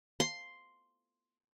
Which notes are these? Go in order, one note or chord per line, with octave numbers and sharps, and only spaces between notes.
C6